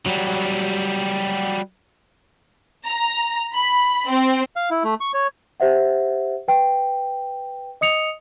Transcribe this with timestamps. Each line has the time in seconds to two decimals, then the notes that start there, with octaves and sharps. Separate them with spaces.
0.06 F#3 G3
2.86 A#5
3.54 B5
4.08 C4
4.56 F5
4.71 E4
4.84 A3
5.01 C#6
5.14 C#5
5.60 G4 C5 E5 F#5
6.48 B4 G5
7.81 D#5 D#6 C#7 F7